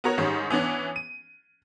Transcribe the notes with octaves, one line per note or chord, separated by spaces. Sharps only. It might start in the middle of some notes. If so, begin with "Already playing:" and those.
B3 F#4 A#4 C#5
G#2 D#3 G3 C#4
E3 B3 C#4 D4
D#7